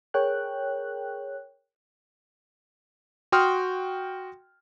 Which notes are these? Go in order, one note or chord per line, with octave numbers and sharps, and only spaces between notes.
G#4 A#4 C#5 G5 F#6
F#4 G5 C6 D#6 F6